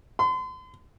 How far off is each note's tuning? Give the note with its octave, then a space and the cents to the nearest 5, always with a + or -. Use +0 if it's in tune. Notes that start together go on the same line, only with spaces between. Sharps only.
C6 -40